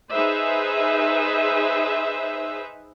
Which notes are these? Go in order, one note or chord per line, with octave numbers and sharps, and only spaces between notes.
D#4 G#4 B4 C5 E5